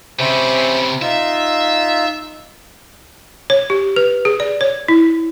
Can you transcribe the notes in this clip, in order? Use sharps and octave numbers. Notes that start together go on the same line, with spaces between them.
C3 C#4 C5 E5 B5
D#4 F4 E5
C#5
G4
B4
G#4
D5
C#5
E4